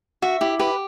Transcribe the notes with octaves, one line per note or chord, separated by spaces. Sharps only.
F#4 E5
E4 G4
G4 B4